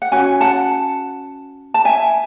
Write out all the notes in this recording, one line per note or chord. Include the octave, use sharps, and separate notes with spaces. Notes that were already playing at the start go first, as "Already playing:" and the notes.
F#5
C#4 F#4 G#5
F#5 A5
A5
E5 G#5